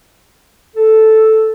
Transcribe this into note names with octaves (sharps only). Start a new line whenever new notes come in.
A4